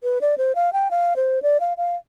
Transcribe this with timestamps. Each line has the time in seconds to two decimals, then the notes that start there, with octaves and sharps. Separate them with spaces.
0.03 B4
0.21 D5
0.38 C5
0.55 F5
0.73 G5
0.91 F5
1.16 C5
1.43 D5
1.60 F5
1.77 F5